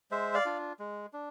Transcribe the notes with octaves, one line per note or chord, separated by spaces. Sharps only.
G#3 C5 E5
D5 F5
D4 F4
G#3
D4